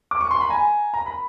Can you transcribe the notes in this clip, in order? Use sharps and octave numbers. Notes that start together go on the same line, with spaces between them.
D6
C#6
C6
B5
G#5 A#5
A#5
B5